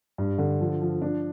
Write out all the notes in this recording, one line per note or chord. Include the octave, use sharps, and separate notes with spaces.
G2
D3
F3
F3
D4